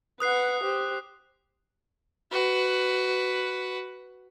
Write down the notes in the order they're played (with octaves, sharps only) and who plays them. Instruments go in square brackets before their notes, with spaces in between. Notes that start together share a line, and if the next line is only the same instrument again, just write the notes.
[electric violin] B4 F#5 [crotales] D#6 F#6 C7
[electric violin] G4 C5
[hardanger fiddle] F#4 B4